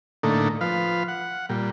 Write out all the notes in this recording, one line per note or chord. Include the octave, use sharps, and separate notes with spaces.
A2 D3 A3 A#3 D#4
F3 B4 F5
F#5
A#2 G3